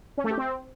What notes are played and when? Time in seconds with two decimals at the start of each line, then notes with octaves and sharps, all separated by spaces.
0.18 C#4
0.24 A3
0.31 G4
0.37 C4